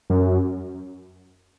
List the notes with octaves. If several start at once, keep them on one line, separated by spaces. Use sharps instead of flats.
F#2